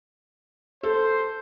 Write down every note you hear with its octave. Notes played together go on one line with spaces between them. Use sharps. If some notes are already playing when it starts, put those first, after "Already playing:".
A4 C5